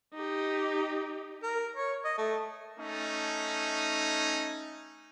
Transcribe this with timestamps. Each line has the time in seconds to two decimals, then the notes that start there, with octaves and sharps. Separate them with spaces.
0.14 D#4 G4
1.43 A#4
1.76 C#5
2.05 D#5
2.18 A3
2.78 A3 C#4 D#4